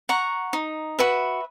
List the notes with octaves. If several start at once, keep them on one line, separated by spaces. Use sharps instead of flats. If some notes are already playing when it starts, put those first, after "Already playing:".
F#5 A#5 C#6
D#4
F#4 B4 E5